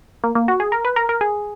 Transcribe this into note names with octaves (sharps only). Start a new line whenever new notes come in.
A#3
A#3
F#4
G#4
A#4
B4
A#4
A#4
G#4